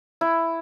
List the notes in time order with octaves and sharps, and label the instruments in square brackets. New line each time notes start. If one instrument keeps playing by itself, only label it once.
[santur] E4